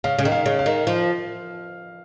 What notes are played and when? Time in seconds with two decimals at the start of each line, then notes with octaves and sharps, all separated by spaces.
0.04 C#3 F5
0.19 C#3
0.25 D#3
0.32 F5
0.46 C#3
0.59 F5
0.66 D#3
0.87 F3